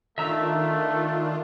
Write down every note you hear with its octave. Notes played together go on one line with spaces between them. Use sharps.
D#3 A3 D4 F4 E5 A#5 E6